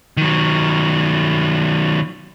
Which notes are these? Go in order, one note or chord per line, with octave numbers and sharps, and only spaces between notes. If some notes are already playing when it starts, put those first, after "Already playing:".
D#3 F#3